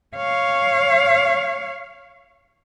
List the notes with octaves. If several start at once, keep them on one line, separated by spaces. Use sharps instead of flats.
C#5 F5